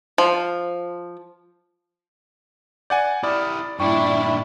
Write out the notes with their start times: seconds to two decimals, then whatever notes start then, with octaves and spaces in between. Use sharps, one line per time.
0.18 F3
2.90 D5 F#5 G#5 G6
3.23 E4 G4 D5 B5 D#6 F6
3.80 G2 A#2 D4 E4 G5 C#6